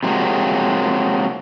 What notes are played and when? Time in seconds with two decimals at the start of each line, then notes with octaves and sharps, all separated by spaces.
0.03 C3 F3 F#3 G#3 A#3